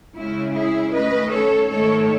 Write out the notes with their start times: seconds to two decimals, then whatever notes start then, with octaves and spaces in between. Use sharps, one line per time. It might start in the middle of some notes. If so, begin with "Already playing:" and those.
0.15 C#3 G#3 C#4 E4
0.53 E4 G#4
0.91 D#3 A3 C#4 B4 D#5
1.30 A4 C#5
1.67 G#2 D#3 A3 A4 C#5